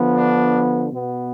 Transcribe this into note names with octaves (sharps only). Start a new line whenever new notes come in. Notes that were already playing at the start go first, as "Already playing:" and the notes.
Already playing: D3 F3 B3
D4
B2 B3